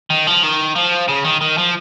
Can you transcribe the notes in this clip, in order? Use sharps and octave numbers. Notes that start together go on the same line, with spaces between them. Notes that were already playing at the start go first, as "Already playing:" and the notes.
D#3
F3
D#3
F3
C#3
D#3
D#3
F3